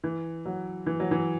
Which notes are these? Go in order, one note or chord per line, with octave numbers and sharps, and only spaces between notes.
E3
F#3
E3
F#3
E3